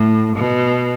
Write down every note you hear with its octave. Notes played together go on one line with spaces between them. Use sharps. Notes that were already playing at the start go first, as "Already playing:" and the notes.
Already playing: A2
B2